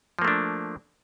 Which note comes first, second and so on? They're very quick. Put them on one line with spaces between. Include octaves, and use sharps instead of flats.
F3 A#3 A3 D4